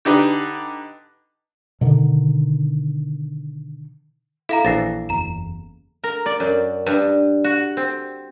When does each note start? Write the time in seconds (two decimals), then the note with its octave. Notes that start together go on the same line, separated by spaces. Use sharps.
0.05 D3 D4 D#4 G4 B4
1.81 B2 D3 D#3
4.49 E4 A4 F5 A#5
4.65 A#1 E3 A6 A#6 C7
5.09 F#1 E2 A#5 E7
6.04 A#4
6.26 D5
6.40 F#2
6.86 G2
7.44 F#4
7.77 C4